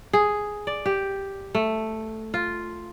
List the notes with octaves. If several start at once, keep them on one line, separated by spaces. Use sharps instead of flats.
G#4
D5
G4
A3
F4